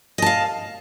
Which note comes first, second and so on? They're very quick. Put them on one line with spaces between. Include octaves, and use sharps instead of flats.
D#5 A5 F5